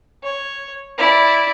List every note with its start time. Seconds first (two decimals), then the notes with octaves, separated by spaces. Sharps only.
0.23 C#5
0.98 E4 D5